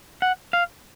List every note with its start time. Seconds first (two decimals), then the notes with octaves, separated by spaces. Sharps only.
0.22 F#5
0.53 F5